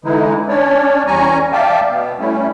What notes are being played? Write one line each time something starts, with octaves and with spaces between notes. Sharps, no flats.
D3 E3 G#3 D#4 E4
C#4 D4 C#5 D5
E2 G3 C#4 G#5 A#5 C#6
D5 E5 F5 G5 A5 D6
B2 B3
G3 A3 C#4 E4